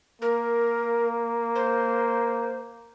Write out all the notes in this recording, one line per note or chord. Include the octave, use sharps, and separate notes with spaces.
A#3 A#4
C5